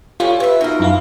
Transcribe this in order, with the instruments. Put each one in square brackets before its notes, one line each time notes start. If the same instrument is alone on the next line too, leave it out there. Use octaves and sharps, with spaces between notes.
[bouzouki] A2 G3 C#4 [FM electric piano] F4
[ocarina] B4 [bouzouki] C#5 E5
[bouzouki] B2 A#4 [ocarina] D#4
[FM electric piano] F#2 E4 F5